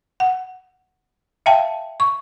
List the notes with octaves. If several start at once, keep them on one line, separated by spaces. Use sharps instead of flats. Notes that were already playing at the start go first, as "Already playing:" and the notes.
F#5
E5 F5 G5 A5
C#6